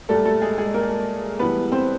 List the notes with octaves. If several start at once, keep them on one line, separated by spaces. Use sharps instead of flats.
A#2 G3 A3 A4
A3 A4
G#3 G#4
G#3 G#4
A#3 A#4
A2 E3 G3 B3 B4
C4 C5